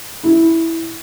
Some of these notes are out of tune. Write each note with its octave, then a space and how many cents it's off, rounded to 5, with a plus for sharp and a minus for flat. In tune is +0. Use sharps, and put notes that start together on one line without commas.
E4 -5